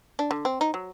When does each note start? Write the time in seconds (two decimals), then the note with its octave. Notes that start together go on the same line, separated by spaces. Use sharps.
0.19 D4
0.31 D3
0.45 C4
0.61 D#4
0.74 F#3